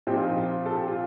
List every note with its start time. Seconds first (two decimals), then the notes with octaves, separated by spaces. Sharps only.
0.07 A#2 F3 C4 D#4 G4
0.17 F4
0.27 D#4
0.37 F4
0.66 A4
0.76 G4
0.88 F4